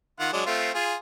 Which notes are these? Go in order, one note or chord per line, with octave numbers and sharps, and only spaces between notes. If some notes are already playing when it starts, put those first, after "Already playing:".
D#3 F4 F#5
F#3 G#3 D4
A3 C4 F4
F4 G#4